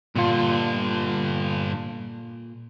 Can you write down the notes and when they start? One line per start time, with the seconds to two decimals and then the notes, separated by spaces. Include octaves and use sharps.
0.15 G2 A#2 D3 F4